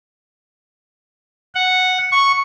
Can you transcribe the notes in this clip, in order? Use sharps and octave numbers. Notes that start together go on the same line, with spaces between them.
F#5
C#6